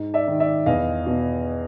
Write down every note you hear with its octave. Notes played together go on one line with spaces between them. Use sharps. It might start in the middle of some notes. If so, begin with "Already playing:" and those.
Already playing: G#2
D5 E5
D#3
D5 E5
E2 D#5 F5
B2